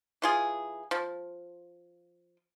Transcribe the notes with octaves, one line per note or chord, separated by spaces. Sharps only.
E3 F4 G#4
F3